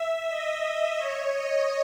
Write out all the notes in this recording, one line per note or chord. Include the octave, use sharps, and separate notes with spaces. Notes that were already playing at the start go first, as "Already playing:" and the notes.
Already playing: E5
D#5
C#5
D#5